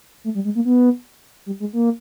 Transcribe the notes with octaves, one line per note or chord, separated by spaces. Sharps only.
A3
G3
G#3
A#3
B3
G3
G#3
A#3